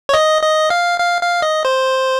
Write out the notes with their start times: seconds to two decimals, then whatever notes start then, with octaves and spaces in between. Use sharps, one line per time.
0.09 C#5
0.14 D#5
0.42 D#5
0.70 F5
1.00 F5
1.21 F5
1.42 D#5
1.65 C5